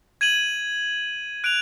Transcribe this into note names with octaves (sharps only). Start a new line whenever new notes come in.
G#6 D#7 F#7
F#6 D7 F7